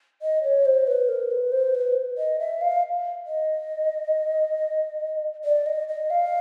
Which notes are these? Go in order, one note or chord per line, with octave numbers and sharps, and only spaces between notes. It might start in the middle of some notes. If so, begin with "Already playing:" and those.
D#5
C#5
C5
B4
A#4
B4
C5
B4
D#5
E5
F5
D#5
D5
D#5
D#5
F5